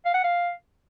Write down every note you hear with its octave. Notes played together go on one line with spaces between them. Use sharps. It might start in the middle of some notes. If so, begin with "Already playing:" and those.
F5
F#5
F5